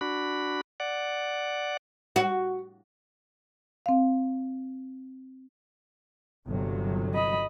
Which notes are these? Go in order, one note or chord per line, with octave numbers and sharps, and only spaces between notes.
D4 F#4 B5
D5 F#5
F#4
C4 F5
G1 C3 F#3
D#5 B5